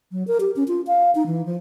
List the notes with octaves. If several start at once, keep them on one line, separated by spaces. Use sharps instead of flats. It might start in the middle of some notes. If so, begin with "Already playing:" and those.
F#3
A#4
G4
C#4
F4
F5
D#4
E3
F3